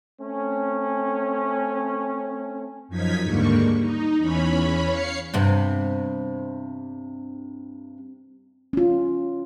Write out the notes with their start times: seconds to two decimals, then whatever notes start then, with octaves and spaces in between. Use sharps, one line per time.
0.20 A3 C4 C#4
2.88 F#2 F3 D#4 G#6 B6
3.21 D#2 G#2 D3 G3 A#3 C#6
3.78 D#4
4.18 E2 E3 C#4 C#5 B5
4.87 C#5 F5 C7 C#7
5.34 G2 C3 B3
8.73 C#4 F4